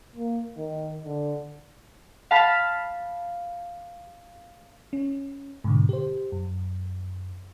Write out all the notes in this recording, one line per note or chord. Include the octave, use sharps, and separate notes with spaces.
A#3
D#3
D3
F5 A5 B5 F6
C#4
G#2 B2 D3
G4 C5
F#2